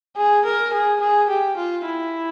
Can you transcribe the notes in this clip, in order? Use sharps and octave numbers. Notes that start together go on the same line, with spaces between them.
G#4
A#4
G#4
G#4
G4
F4
E4